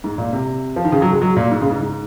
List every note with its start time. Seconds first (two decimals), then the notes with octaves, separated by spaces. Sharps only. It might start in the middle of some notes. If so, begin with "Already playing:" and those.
0.04 G#2
0.18 A#2
0.33 C3
0.76 F3
0.85 D#3
0.92 C#3
1.02 F#3
1.12 G#3
1.22 F#3
1.37 A#2
1.51 G#2
1.61 C#3
1.71 G#2
1.81 G#2